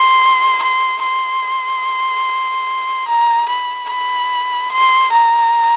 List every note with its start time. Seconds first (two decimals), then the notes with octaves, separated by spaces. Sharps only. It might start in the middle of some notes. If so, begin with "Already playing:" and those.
Already playing: C6
0.62 C6
1.03 C6
3.08 A#5
3.48 B5
3.89 B5
4.72 C6
5.12 A#5